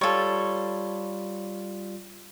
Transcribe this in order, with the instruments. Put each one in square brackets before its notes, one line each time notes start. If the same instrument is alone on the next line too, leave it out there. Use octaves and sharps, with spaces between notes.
[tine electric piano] G3 F4 [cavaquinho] A4 C#5